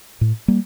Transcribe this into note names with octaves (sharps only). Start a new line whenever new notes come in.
A2
G3 A#3